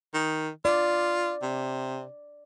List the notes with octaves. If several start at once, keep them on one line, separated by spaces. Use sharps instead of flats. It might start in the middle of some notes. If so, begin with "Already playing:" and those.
D#3
F4 D5
C3